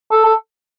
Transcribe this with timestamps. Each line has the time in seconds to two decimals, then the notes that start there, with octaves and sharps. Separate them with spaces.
0.11 A4
0.24 A4